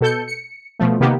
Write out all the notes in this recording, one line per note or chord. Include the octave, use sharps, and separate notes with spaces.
B2 A4 G6 C#7
C#7
B2 F3 A3
C3 D#3 A#3 B3 G4